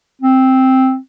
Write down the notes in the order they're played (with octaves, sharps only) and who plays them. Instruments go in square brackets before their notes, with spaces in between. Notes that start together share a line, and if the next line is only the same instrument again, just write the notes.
[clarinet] C4